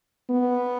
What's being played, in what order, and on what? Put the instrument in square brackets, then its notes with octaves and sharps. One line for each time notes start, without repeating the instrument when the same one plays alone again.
[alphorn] B3